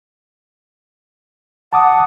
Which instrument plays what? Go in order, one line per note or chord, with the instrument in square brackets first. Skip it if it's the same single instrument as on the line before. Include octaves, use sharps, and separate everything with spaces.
[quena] F#5 [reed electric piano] A5 D6 D#6